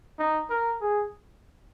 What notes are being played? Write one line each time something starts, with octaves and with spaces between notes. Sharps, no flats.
D#4
A#4
G#4